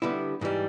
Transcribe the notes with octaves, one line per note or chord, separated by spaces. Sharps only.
D3 G3 B3 E4
G#2 E3 G3